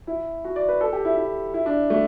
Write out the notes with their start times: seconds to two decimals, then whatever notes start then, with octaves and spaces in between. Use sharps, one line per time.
0.07 E4
0.44 F#4
0.56 D5
0.68 B4
0.81 A4
0.93 G4
1.05 E4
1.17 E4
1.54 E4
1.66 D4
1.90 A3